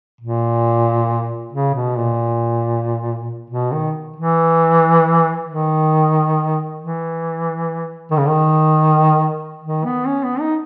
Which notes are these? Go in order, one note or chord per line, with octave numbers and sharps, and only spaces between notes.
A#2
C#3
B2
A#2
B2
D#3
E3
D#3
E3
D#3
C#3
D#3
D#3
B3
C#4
B3
D#4